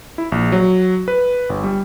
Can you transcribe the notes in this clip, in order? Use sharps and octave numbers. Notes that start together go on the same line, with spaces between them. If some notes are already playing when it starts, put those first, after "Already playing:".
E4
A#1
F#3
B4
G1
G3